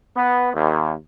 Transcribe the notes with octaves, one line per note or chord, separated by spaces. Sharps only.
B3
D#2